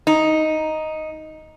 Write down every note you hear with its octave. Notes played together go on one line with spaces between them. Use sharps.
D#4